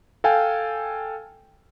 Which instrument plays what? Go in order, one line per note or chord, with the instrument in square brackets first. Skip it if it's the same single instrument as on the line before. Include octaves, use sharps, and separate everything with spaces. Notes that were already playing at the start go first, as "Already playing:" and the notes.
[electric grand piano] A4 F5 G5 G#5